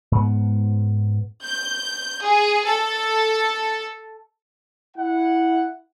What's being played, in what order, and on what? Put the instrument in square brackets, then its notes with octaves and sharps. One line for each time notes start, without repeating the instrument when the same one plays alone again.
[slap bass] G#2 B3
[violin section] G6
G#4
A4
[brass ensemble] E4 F#5